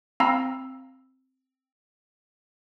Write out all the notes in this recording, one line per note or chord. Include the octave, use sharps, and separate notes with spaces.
C4 F5 A#5 B5 E6